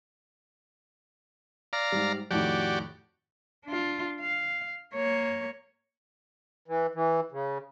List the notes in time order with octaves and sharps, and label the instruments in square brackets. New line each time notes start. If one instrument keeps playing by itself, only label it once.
[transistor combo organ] D5 F5 A#5
[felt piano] G#2 G3
[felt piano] F2 A2 D#3 [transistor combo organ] F#4 G4 D5
[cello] D4 F4
F5
A#3 C#5
[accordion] E3
E3
C#3